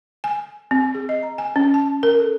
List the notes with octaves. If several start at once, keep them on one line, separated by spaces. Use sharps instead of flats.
G#5
C4
G#4
D#5
A#5
G#5
C#4
A5
A#4
A4